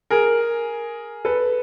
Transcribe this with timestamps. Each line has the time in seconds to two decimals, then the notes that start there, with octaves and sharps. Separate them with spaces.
0.10 G#4 A#4
1.25 A4 B4